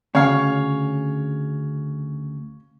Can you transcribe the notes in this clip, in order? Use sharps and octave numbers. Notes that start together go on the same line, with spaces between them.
D2 C#3 C#5 F5